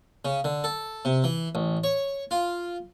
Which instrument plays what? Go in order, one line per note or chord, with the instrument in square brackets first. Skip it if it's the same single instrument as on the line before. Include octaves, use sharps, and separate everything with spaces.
[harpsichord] C#3
D3
A4
C3
E3
A1
C#5
F4